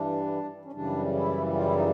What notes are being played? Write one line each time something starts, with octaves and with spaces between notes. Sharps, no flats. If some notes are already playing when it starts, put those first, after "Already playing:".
Already playing: G2 E3 G3 D4
C#4
F#2 C#3 E3 G3 D4
E4
F4
E4
D#4